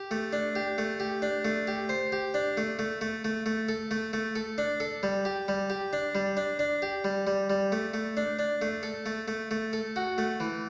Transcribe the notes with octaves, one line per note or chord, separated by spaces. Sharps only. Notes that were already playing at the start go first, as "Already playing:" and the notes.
Already playing: G4
A3
D4
G4
A3
G4
D4
A3
G4
C5
G4
D4
A3
A3
A3
A3
A3
A4
A3
A3
A4
D4
A4
G3
G4
G3
G4
D4
G3
D4
D4
G4
G3
G3
G3
A3
A3
D4
D4
A3
A4
A3
A3
A3
A4
F#4
A3
E3